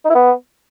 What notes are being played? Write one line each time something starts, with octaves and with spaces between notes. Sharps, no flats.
D#4
E4
B3